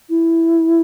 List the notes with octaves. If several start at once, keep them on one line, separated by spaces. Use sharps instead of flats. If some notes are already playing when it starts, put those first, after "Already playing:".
E4